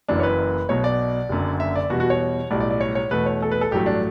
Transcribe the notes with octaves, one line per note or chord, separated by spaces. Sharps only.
F#1 F#2 E3 D4
C#5
B4
B1 B2 F#3 C#5
D5
F#1 F#2 D3
E5
D5
E2 B2 G3 F#4
F#4
C#5
B1 A2 G3 D5
D5
D5
C#5
C#5
E2 B2 A3 B4
C#5
A4
B4
A4
A1 G2 F#3 A3 G4
D4